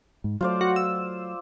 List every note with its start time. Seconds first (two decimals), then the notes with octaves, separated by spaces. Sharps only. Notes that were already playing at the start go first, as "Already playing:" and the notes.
0.24 G#2
0.41 F#3 A3 F4 C5 D5
0.61 F#4
0.76 E6